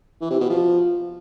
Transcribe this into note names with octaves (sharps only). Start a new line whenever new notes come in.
E3
C3
B2
F3